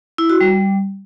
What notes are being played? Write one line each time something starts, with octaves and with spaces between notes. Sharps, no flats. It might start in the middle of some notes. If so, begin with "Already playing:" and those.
E4
F#4
G3